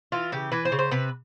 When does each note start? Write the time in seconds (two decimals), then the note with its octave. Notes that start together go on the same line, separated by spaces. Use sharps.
0.12 E3 F4
0.32 C#3 G4
0.52 E3 B4
0.65 C5
0.72 C#3
0.79 C5
0.91 C3 B4